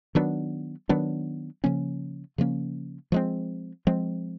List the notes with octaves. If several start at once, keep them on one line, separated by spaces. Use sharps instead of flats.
D#3 F#3 B3 D4
D#3 F#3 B3 D4
C#3 F3 A#3 C#4
C#3 F3 A#3 C#4
F3 G#3 C4
F3 G#3 C4